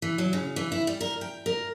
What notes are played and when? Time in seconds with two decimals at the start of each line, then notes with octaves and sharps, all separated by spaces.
0.02 E3
0.18 F#3
0.33 C#3
0.56 E3
0.72 E4
0.87 G3
1.01 A#4
1.21 G5
1.46 A#4